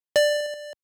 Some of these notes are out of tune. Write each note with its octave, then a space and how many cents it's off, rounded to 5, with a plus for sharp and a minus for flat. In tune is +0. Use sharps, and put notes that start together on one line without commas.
D5 +10